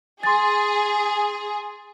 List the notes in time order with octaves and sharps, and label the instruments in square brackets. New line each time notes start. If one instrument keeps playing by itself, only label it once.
[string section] G#4 [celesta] C6 A6